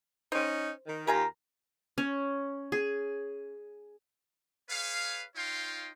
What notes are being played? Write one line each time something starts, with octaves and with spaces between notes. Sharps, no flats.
C#4 D#4 C5
D#3
D#2 F4 G4 A#4 G#5 A#5
C#4
G#4
G#4 B4 C#5 F5
D#4 F4 C#5 F5 G5 C6